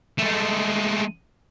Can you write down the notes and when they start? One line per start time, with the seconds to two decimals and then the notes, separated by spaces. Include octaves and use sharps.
0.18 G#3 A3